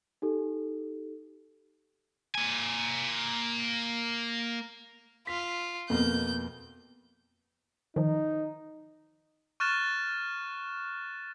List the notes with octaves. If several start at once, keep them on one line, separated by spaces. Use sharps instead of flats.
D#4 G4 A4
A#3 G#5
F4 B6
F2 B2 A#3 G6
D#3 F3 D#4
C#6 F6 F#6 A6 E7